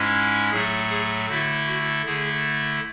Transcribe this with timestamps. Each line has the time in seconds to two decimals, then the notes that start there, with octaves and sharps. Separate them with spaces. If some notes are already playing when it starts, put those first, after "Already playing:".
Already playing: G#2 G#3 C#4 E4
0.51 A2 F#3 A3 G#4
0.90 G#4
1.28 D3 A3 E4 F#4
1.67 F#4
2.06 D3 A3 E4 G#4